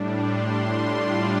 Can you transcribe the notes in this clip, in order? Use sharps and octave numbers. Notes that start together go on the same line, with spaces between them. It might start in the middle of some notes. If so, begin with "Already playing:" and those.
Already playing: A2 G3 D4
C6
A2 G3 D4 F4